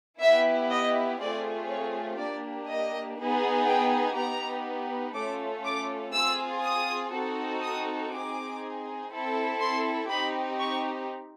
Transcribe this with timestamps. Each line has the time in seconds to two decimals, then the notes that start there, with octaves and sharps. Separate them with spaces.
0.20 B3 E4 G4 E5
0.70 D#5
1.19 A3 C4 F4 G#4 D5
1.68 C#5
2.17 A#3 D4 G4 D5
2.67 D#5
3.17 B3 D#4 G#4
3.66 G5
4.15 B3 D#4 G4 A#5
5.14 A3 C#4 F4 A4 D6
5.64 D6
6.13 C4 F4 G#4 E6
6.62 D#6
7.12 C4 D#4 F#4 A4
7.61 D#6
8.11 C4 D#4 G#4 D6
9.10 C4 E4 A4
9.60 C6
10.08 C4 D#4 G4 B5
10.58 C#6